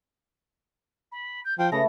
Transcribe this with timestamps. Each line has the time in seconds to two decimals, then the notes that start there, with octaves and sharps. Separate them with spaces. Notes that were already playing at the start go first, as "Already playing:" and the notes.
1.12 B5
1.45 G6
1.58 F3 G5
1.72 C#3 A3 A4 B4 A#6